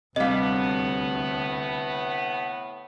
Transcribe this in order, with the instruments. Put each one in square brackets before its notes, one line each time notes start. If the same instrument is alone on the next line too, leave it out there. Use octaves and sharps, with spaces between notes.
[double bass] D2 [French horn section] A2 B3 [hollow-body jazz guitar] C3 G3 [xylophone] D#5 F5